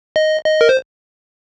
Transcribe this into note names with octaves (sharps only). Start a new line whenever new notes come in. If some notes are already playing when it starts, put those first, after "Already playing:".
D#5
D#5
A#4
C5